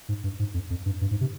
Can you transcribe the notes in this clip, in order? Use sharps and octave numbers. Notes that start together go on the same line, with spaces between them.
G#2
G2
G#2
F2
F2
G2
G2
G#2
C3